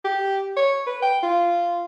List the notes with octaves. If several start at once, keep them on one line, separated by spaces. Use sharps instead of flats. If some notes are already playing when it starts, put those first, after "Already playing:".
G4
C#5
B4
G5
F4